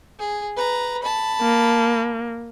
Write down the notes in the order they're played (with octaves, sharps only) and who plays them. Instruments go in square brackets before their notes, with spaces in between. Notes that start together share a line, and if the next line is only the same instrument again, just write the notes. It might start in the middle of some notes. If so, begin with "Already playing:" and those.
[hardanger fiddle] G#4
B4 A#5
A5 B5
[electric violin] A#3